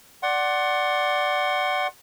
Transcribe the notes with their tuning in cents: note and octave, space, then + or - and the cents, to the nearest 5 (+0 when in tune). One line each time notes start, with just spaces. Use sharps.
D5 +0 F#5 +15 C6 +35